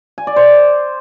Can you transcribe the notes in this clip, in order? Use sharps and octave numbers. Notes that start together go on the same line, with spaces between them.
G#5
D5
C5